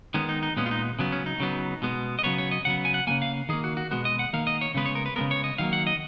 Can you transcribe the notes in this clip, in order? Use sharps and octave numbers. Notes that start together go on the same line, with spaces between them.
D#3 G#3 B3 C#4
D#4
D#4
A#2 G#3 B3 C#4
F4
D#4
C#3 F#3 B3
C#4
D#4
C#3 F#3 B3
B2 G#3 B3
D#5
C#3 F#3 B3 C#5
C#5
D#5
C#3 F#3 B3 F#5
G#5
F#5
C#3 F#3 A#3 G#5
F5
D#3 A#3 G#4
F#4
F#4
B2 G#3 B3 F#4
D#5
F#5
D#3 A#3 F5
D#5
C#5
C#3 G#3 B3 B4
C#5
A#4
B4
C#3 G#3 B3 A#4
C#5
D#5
D#3 F#3 A#3 F5
F#5
D#5